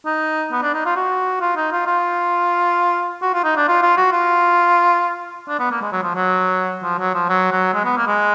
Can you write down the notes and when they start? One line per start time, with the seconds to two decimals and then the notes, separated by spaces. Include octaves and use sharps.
0.05 D#4
0.52 B3
0.62 D4
0.74 D#4
0.85 F4
0.96 F#4
1.41 F4
1.56 D#4
1.72 F4
1.87 F4
3.22 F#4
3.34 F4
3.44 D#4
3.56 D4
3.68 F4
3.82 F4
3.97 F#4
4.12 F4
5.48 D4
5.59 B3
5.71 A#3
5.81 G#3
5.92 F#3
6.03 F3
6.15 F#3
6.83 F3
6.99 F#3
7.14 F3
7.29 F#3
7.52 F#3
7.74 G#3
7.85 B3
7.97 A#3
8.07 G#3